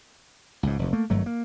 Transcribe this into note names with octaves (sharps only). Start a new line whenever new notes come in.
C#2 G#2
F1 D#2
A3 A#3
G#1 G2 F#3 A3
A#3